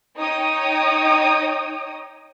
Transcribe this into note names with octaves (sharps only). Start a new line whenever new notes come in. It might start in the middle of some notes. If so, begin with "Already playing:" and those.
D#4 C#5 G5 D#6